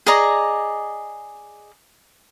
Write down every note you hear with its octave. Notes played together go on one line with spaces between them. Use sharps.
G#4 D5 D#5 A#5